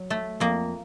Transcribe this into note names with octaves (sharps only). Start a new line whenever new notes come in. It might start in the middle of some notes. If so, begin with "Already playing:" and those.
Already playing: F#3
A3
F2 A#3